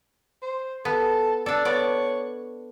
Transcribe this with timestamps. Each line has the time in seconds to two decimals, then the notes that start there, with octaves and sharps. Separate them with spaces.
0.42 C5
0.85 B3 A4
1.46 D4 A4 D5
1.65 B3 C#5 D5